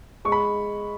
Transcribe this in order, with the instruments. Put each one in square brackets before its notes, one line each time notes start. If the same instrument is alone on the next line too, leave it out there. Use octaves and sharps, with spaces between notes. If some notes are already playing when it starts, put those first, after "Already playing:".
[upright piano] G#3 C#6
B5